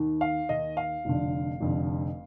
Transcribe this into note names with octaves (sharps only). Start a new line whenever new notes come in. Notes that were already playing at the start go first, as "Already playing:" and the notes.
Already playing: D#2 D#3
F5
D#2 D#3 D#5
F5
F1 F2 D3
F1 F2 D3